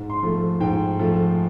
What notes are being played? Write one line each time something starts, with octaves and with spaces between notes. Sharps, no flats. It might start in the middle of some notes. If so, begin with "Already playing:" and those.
Already playing: G#2
C6
F3 A3
G#2 G5
F3 A3